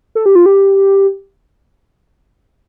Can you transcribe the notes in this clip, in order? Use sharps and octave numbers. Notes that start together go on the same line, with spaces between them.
A4
G4
F4
G4